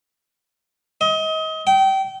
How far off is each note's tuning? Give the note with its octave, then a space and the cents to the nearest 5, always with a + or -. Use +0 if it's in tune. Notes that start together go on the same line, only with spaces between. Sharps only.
D#5 +30
G5 -25